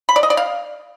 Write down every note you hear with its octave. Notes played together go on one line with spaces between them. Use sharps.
B5
D5
D#5
D5
F5